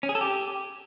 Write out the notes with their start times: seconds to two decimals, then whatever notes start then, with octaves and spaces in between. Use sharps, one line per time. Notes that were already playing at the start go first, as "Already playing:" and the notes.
0.03 C#4
0.09 G#4
0.15 A4
0.21 G4